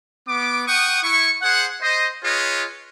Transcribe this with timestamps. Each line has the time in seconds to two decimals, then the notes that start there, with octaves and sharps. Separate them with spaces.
0.28 B3 D6
0.67 F#5 G5 C#6 D#6
1.03 E4 C#6
1.41 G#4 C5 F#5
1.81 C5 D#5
2.23 F4 G#4 B4 C#5 D#5